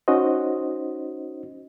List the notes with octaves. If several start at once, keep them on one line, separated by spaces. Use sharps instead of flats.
C#4 D#4 F#4 C5 D#5